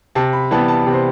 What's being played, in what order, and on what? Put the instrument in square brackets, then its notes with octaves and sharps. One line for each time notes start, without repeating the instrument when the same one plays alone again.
[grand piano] C3 A5
B5
E3 G3 B3 A5
A5
C3
C5